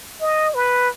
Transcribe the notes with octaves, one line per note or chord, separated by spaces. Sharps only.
D#5
B4